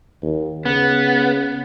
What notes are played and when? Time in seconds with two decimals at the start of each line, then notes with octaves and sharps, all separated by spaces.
0.22 D#2
0.66 C#3 B3